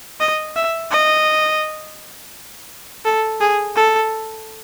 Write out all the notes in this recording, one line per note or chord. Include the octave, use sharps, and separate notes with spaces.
D#5
E5
D#5
A4
G#4
A4